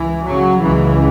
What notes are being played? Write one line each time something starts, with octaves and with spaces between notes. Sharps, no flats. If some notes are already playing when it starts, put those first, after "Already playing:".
Already playing: C#2 E3
C#3 F#3
C#2 C#3 E3